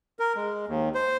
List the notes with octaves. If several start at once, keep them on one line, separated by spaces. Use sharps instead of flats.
A#4
G#3
D#2
C5